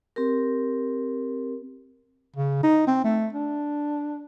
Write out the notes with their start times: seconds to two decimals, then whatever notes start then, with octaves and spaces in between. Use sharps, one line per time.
0.16 C4 G4 A#4
2.36 C#3
2.63 D#4
2.87 C4
3.04 A3
3.33 D4